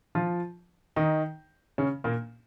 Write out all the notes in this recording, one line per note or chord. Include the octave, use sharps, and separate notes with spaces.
F3 F4
D#3 D#4
C#3 C#4
A#2 A#3